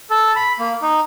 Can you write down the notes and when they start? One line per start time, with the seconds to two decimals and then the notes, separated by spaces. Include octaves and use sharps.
0.11 A4
0.36 B5
0.59 A#3
0.82 D#4